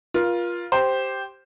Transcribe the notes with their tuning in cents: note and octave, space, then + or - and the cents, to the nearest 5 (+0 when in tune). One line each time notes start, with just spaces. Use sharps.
F4 +0 A#4 +40
G4 -5 C5 +0